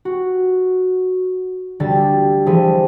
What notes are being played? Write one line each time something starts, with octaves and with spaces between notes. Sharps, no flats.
F#4
D2 D3 G3 A6
E3 F3 G3 A3 G#4